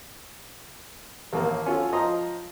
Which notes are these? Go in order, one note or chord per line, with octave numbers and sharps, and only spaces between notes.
A1 D#2 A#3
C#4 F4 F#4 A4
F3 D#5 A#5 C6